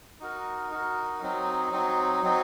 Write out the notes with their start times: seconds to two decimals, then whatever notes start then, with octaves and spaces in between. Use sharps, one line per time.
0.20 D#4 F#4 A#4
0.71 D#4 F#4 A#4
1.22 F#3 C4 D#4
1.72 F#3 C4 D#4
2.23 F#3 C4 D#4